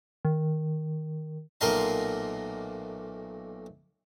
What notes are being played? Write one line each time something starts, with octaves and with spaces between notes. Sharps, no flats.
D#3
B1 A#2 A3 A#4 D#5 C6